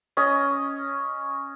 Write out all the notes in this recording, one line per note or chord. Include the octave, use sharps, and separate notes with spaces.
C#4 D#5